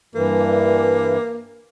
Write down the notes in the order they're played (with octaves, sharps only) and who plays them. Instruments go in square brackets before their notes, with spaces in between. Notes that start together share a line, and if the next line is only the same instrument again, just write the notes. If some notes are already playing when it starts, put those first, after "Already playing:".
[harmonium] G2 E3 [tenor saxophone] A#3